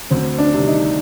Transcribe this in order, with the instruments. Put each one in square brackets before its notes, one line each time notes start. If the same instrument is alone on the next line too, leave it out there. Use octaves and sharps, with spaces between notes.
[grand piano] D2 C4
D4
C3 D#3 G3
D#4